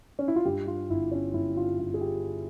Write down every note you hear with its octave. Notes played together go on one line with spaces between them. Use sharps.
C#4
E4
F4
G2 G4
F4
G1 E4
C#4
G1 E4
F4
G2 F4
G#4
G4